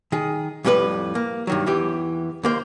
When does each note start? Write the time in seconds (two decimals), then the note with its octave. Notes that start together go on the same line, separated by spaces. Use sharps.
0.12 D#3 G#4
0.65 F2 A2 G3 A#4 B4
1.15 A#3
1.47 G2 D#3 F#3
1.67 E2 E3 G4
2.43 D#2 A#3 C5